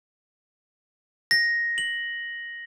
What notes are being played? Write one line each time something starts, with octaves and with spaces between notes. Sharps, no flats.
A#6
F#7